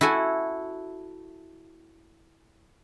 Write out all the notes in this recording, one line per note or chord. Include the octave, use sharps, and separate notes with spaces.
E4 F#4 A4 G#5